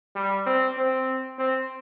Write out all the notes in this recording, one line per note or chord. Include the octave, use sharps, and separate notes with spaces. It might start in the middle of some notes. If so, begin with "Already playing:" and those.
G3
C4
C4
C4